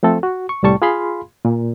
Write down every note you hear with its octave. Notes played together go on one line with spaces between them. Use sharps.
F3 A3 C4 A4
F#4
C#6
C2 A2 G3 A5 C#6
F4 G#4 F5 B5 C6
A#2